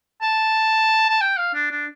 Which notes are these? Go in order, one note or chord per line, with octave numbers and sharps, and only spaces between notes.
A5
A5
G5
F5
D4
D4